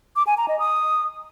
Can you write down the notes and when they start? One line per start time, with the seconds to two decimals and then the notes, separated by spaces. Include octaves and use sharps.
0.16 D6
0.27 G#5
0.38 A#5
0.48 D#5
0.59 D#6